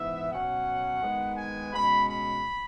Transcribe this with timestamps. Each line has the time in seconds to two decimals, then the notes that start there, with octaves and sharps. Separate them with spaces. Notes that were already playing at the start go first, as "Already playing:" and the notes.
Already playing: G#2 E3 B3 E5
0.31 B2 F#3 C#4 F#5
1.02 D#3 G#3 B3
1.37 G#5
1.73 B2 G#3 C#4 B5
2.08 B5